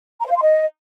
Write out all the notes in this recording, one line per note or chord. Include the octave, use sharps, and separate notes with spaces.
A#5
C5
F5
C6
D#5